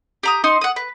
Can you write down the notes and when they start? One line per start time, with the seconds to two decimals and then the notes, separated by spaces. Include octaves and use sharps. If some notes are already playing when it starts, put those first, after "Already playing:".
0.23 G4 A#5 D#6
0.44 D#4 C6 D#6
0.61 F#5 D#6
0.76 B4